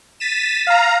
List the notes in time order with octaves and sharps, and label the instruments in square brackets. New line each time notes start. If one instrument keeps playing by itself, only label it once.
[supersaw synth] A6 B6 D#7 E7
F5 A#5